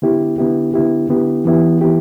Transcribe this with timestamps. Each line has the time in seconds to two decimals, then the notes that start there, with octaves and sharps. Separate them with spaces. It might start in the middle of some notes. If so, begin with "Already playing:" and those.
0.02 D3 B3 E4 G4
0.38 D3 B3 E4 G4
0.74 D3 B3 E4 G4
1.09 D3 B3 E4 G4
1.45 E3 B3 E4 G4
1.81 E3 B3 E4 G4